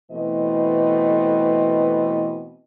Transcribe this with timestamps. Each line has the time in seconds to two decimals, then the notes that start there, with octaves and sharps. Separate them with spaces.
0.11 B2 E3 A3 C4 B4 D#5